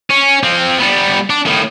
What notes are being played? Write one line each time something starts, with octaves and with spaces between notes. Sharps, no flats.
C#4
F3 C4
G3 B3
D4
A2 D#3